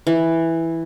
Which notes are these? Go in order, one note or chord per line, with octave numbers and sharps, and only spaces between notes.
E3